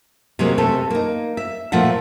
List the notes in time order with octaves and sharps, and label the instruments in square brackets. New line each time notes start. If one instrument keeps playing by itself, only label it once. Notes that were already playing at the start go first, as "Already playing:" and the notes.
[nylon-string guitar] C3 F#3 G#3 A#3
C3 A3 A4
A#3 D#4
E5
A#2 F3 A3 E5 F#5